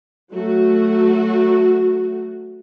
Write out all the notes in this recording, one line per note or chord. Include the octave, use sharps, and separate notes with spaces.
F#3 A3 F#4